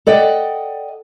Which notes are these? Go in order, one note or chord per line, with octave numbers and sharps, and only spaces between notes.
A4 D5 D#5 F#5 G5